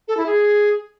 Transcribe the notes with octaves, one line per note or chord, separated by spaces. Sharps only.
A4
E4
G#4